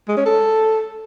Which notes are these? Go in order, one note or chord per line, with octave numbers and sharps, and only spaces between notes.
G#3
C#4
A4